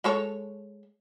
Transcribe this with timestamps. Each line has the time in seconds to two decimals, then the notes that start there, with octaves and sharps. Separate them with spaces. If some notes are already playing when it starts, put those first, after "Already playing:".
0.04 G#3 A4 C#5